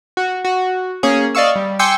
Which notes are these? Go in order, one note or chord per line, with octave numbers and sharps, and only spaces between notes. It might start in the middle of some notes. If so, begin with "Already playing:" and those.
F#4
F#4
A#3 C#4 G#4
D5 D#5 F5 C#6 E6
G3
G5 G#5 C6 D6 E6 C#7